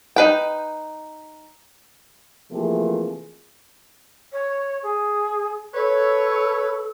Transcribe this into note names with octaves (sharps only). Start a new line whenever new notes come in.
D#4 B4 G5
C3 E3 F3 A3 A#3 G#4
C#5
G#4
A4 B4 C#5